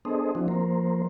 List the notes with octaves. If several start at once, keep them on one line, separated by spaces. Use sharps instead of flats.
B3 D4 G#4 A4 C5 D#5
F3 C4 D4 E4 F#4
F3 A#3 A#4 C5